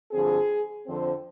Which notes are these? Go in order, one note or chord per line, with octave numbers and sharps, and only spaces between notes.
G2 D3 F3 C4 G#4
F2 D3 F3 C4 C5